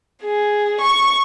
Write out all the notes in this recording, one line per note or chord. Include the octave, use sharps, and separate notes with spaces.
G#4
C#6